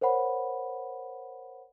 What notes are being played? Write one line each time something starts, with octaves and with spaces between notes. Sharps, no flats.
A#4 C5 C#5 F#5 B5